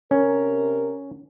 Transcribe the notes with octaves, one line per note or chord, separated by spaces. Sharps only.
C3 C#4 A#4